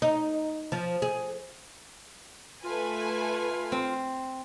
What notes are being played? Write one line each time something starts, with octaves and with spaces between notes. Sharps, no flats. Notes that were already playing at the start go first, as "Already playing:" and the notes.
D#4
F3
G#4
A3 F4 B4 G#5
C4